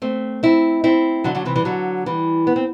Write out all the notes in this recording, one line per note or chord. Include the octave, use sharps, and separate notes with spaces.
A3 C4
C4 E4
C4 E4
D3 F#3
D3 F#3
C3 E3
E3 G3
D3 F#3
E3 G3
B3
C4